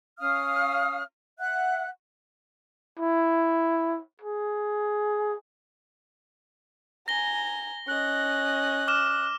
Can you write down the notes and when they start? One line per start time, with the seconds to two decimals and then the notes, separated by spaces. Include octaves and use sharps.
0.19 C#4 F5 D#6 F6
1.39 E5 F#5 F#6
2.99 E4
4.22 G#4
7.08 G#5 A#5 A#6 G7
7.88 C#4 D#5 F#6
8.88 D6 F6 E7